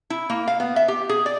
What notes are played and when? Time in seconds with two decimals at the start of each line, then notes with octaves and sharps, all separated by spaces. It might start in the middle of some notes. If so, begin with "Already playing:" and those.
0.10 E4
0.30 A#3
0.48 F5
0.60 B3
0.76 E5
0.88 G4
1.09 G#4
1.26 D5